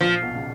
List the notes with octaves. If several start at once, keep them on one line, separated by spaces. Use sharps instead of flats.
A#1 A#2 F3
B1 B2
C#3